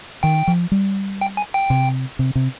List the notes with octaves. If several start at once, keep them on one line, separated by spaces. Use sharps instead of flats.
D#3 G5
F3
G3
G5
G#5
G5
C3
C3
C3